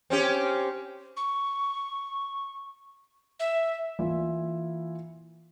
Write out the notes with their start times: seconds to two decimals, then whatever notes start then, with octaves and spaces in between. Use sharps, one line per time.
0.10 C4 C#4 G4
1.17 C#6
3.40 E5
3.99 E3 A#3 E4 F4